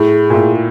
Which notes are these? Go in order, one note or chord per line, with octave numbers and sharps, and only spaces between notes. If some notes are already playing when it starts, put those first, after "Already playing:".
Already playing: A2 G#4
A#2
A2